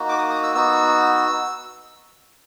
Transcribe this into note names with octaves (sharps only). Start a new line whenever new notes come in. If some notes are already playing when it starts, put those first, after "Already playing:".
Already playing: A#3 D#4 F#4
D6
D#6
D#6
E6
B3 D#4 F#4 E6